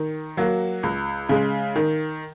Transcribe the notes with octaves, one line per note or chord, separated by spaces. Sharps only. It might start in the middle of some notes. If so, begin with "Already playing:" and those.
Already playing: D#3
F#3 A#3 F#4
C#2
C#3 G#3
D#3